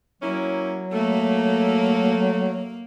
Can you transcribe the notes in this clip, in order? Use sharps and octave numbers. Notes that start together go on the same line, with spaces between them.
F#3 A#3 C#4 E4
A3 A#3